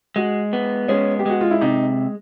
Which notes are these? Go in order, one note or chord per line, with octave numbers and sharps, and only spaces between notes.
G#3 F#4
B3
G#3 C#4
G4
G#3 F#4
F4
E4
C3 D#4